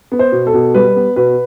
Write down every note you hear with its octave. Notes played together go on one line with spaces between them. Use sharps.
B3
C5
B2
A4
B2
G3 B4
B3
B2 B4